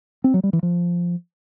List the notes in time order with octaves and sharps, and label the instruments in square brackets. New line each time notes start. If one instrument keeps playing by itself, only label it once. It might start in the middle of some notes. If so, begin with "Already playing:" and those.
[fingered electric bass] C4
F#3
G3
E3
F3